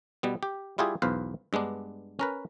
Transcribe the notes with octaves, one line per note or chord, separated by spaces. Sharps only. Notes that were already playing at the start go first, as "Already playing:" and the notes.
B2 G3 B3
G4
G3 E4 F4 G4 G#4
B1 E2 B4 C5 F5
G2 G#3 B3 D4
C#4 A#4 B4